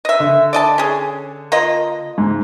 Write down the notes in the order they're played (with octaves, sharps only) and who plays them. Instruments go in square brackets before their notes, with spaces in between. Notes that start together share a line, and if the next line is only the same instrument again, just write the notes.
[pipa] D#5 E5
[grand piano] D3
[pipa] D5 D#5 A5
C#4 G#4
A#3 F4 D#5
[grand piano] G#2